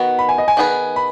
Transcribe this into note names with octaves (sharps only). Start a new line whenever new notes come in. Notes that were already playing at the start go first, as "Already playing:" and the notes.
Already playing: D#3 B3 F#4
B5
G#5
D#5
G#5
D#3 B3 G#4 B4
B5